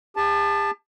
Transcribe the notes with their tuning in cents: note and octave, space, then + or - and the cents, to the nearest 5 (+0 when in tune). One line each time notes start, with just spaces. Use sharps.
G4 +45 A5 +0